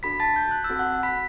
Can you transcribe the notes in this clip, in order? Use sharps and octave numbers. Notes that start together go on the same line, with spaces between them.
D4 F#4 A4 B5 B6
A5 A6
G6
F#6
E6
C4 F#4 A4
F#5 F#6
B5 B6